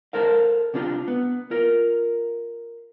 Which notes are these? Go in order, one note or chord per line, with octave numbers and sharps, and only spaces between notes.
A4 A#4 C5 F5
C3 D4 F4
B3
F4 A#4